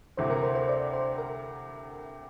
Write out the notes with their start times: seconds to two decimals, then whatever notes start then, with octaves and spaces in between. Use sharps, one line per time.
0.17 D2 C3 E3 C5
0.30 A#4
0.43 C5
0.55 C5
0.69 D5
0.93 C5
1.18 A#4